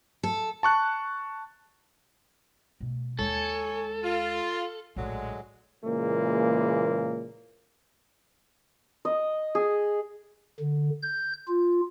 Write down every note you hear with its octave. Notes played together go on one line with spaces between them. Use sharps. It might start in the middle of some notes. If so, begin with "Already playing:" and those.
A4
A5 C#6 F#6
B2 A3
D#2 G#3 A4 C#5 G#5
F4
A#1 A2 D3 F#3 G#3
A#2 C#3 E3 G#3 A#3
D#5
G#4
D3
G6
F4